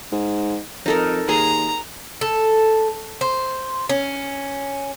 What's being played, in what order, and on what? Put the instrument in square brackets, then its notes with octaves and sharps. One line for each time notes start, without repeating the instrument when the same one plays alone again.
[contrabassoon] G#2
[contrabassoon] F2 [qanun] D#4 A4 A#4
[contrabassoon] D#2 [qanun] G#4 C6 [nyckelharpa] A#5
[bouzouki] A4
C5
C#4